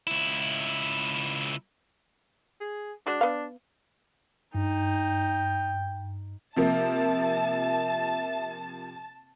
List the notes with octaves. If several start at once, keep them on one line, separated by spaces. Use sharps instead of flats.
C#2 E4
G#4
G#3 D4 F#4
B3 F5
G2 D#4 G5
C3 F3 A#3 E5 A5